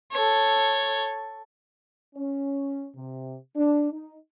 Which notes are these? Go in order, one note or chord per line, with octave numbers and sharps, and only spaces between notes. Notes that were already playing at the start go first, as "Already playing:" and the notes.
A4 C#5
C#4
C3
D4
D#4